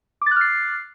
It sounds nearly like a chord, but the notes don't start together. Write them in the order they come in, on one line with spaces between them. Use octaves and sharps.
D6 A6 F#6 F6 C7